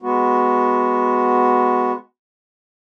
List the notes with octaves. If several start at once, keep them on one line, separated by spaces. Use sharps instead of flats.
G#3 B3 F#4